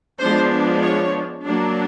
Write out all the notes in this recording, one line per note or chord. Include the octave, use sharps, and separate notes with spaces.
F3 G#3 B3 D4 C5
C#5
F#3 A#3 D4